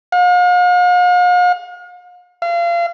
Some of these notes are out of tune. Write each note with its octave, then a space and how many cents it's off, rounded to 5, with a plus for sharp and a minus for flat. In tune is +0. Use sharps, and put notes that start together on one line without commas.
F5 +45
F5 -30